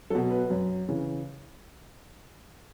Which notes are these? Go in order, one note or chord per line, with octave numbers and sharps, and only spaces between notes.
B2 F#3 A4
B4
F#2
C#3 E3